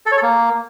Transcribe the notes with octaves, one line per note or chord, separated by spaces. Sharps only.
A4
C#5
A4
A#3